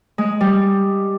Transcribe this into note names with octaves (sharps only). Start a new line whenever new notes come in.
G#3
G3